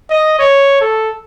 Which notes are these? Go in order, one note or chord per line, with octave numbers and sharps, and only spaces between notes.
D#5
C#5
A4